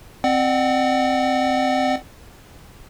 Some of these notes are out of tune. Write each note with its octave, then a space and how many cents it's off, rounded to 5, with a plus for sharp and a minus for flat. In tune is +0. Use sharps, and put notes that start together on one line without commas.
C4 +0 D5 +40 F#5 +15